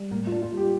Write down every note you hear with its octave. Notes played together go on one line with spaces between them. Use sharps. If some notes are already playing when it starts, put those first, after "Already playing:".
Already playing: G3
A2 A#3
F4
D4
F4
G3
G4